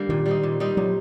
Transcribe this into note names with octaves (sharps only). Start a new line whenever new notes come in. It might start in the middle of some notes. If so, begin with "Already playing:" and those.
Already playing: D3 G3 A#3
A#2 D#3
G3 C4 D#4
A#2
G3 C4 D#4
A#2 F#3